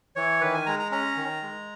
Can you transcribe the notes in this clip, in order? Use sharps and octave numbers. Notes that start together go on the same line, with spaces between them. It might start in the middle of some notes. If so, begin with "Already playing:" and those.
E3 C#5
D#3 B4
G#5
G#3 A#5
A#5
C#4 A#5
D#3
G#3